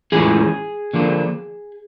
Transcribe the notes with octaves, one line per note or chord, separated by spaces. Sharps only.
A2 E3 G#3 C#4 F4 G#4
D3 F3 A#3 D4 F4